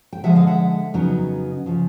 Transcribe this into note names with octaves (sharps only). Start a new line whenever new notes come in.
G5
D3 F3 G#3 E5 F#5
D#5 F5
E5 F#5
F2 C#3 F#3 B3 D#4
C#3 F3